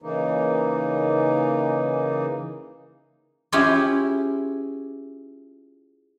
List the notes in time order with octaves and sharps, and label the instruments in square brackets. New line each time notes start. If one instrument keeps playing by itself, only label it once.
[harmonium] C#3 E3 A#3 D#4
[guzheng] C#4 E4 F4 G4 G#4